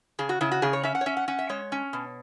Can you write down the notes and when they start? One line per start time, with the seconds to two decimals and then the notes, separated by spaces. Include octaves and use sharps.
0.19 C#3 G#4
0.29 F#4
0.41 C#3 E4
0.52 F#4
0.62 C#3 G#4
0.73 C#5
0.83 C#4 E5
0.95 F#5
1.01 C#5
1.06 C#4 E5
1.17 F#5
1.28 C#4 F#5
1.39 E5
1.49 G#3 C#5
1.72 C#4
1.93 B2